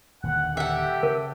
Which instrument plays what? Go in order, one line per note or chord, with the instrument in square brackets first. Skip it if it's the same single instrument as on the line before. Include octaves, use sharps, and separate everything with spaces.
[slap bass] D#1 D#2 D3 [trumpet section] F#5
[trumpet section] G4 A4 G5 [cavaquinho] E5 F#5
[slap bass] C#3 [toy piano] A#4